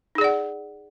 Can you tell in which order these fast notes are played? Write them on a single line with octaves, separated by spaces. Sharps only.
D#4 G#4 D5 F#5